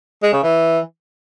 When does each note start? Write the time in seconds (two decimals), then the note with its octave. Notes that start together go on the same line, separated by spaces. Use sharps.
0.23 G#3
0.33 C#3
0.43 E3